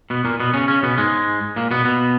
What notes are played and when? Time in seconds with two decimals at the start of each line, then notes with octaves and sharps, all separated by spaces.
0.10 B2 B3
0.25 A#2 A#3
0.40 B2 B3
0.53 C#3 C#4
0.68 C#3 C#4
0.83 B2 B3
0.98 G#2 G#3
1.56 A#2 A#3
1.71 B2 B3
1.85 B2 B3